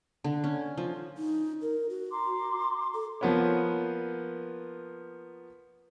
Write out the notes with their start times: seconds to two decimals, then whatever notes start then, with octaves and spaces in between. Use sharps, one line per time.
0.24 D3
0.44 C#4
0.77 F3
1.18 D#4
1.62 A#4
1.89 F#4
2.11 A#5 C6 D6
2.94 A4
3.21 F3 A#3 B3 B4 C#5